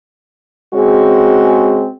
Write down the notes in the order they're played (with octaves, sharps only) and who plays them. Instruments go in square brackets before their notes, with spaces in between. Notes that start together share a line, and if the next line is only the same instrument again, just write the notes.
[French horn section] C#3 G#3 C4 F#4 G#4